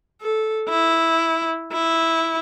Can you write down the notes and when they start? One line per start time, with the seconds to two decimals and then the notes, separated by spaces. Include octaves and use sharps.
0.21 A4
0.69 E4
1.72 E4